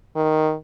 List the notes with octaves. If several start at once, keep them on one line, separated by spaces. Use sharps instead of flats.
D#3